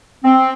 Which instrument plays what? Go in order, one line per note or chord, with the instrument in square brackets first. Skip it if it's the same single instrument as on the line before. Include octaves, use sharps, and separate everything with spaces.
[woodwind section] C4